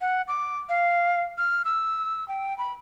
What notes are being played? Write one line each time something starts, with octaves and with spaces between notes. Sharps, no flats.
F#5
D6
F5
F6
E6
G5
B5